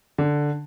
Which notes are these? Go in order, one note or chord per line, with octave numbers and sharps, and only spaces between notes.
D3